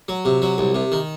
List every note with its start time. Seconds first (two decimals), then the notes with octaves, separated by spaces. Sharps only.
0.09 F#3
0.25 C3
0.42 F#3
0.58 C2
0.75 C3
0.92 D#3